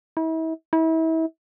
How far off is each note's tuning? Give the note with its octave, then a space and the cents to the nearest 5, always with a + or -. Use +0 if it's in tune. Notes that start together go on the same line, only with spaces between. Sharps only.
E4 -40
E4 -35